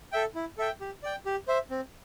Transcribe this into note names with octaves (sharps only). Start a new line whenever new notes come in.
A4 E5 G5
E4
A4 E5 G5
G4
D5 G5
G4
C5 E5
C4